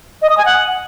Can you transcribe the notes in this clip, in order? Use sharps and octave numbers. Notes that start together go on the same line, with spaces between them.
D#5
D#6
G#5
F#5